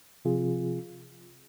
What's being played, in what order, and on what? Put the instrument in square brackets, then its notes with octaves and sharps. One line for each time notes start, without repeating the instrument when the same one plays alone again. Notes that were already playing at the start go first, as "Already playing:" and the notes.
[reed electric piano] C3 F3 C4 F4 G#4